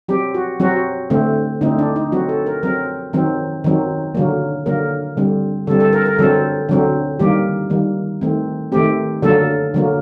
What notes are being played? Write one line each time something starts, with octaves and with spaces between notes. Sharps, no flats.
F#3 C4 G4
F#4
F#3 C4 F#4
D3 A3 C4
D3 A3 C4 D#4
D4
D#4
F#3 C4 F#4
A4
A#4
F#3 C4 A#4
D#3 F#3 C4
D#3 F#3 C4
D3 F#3 A#3
D3 F#3 A#3 A#4
D3 G3 C4
D3 G3 C4 A4
A4
A#4
A#4
D3 F#3 C4 A4
D3 F#3 C4
D#3 G3 A#3 G4
D#3 G3 A#3
D#3 A3 C4
D#3 A3 C4 G4
D3 F#3 A#3 A4
D3 F#3 A#3